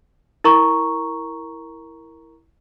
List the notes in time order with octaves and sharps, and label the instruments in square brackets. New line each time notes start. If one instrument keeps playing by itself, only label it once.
[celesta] E4 A#4 A#5 C#6